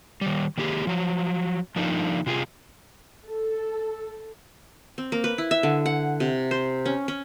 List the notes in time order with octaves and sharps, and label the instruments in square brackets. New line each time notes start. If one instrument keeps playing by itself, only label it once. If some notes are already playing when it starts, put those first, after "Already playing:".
[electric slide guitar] D#3 G3
D#3 A#3 G4 G#4
F3 F#3
F3 G3 A#3 D4 D#4
C3 F4 G4 G#4
[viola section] A4
[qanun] C4
A#3
B4
E4
E5
D3
F#5
C3
C5
C#4
C#4